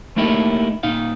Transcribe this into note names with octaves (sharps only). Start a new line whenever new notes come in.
A3 A#3 D#4 E4 G4
A#2 D#4 F5